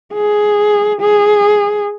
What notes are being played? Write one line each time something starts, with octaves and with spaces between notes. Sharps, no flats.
G#4
G#4